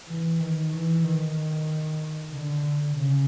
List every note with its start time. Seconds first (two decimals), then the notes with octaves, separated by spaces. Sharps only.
0.09 E3
0.41 D#3
0.72 E3
1.04 D#3
2.33 D3
2.97 C#3